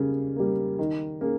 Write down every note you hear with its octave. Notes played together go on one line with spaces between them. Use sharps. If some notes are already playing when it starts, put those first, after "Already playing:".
Already playing: C#3 G3 A#3
G3 A#3
D#3
A#3 C#4 G#4